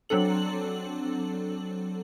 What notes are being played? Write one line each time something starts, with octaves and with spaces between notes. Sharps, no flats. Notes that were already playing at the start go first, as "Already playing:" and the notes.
F#3 C4 D4 A4 F#7